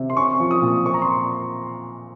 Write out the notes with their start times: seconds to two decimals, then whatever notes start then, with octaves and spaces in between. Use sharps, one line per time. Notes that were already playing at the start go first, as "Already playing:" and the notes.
Already playing: C3
0.10 C6
0.17 C#4 C#6
0.40 F3
0.51 D#6
0.62 A#2
0.85 C4 C#6
0.94 A#5
1.02 C6